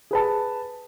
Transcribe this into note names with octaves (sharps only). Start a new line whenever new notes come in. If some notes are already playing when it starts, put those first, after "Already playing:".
G#4 B4 A5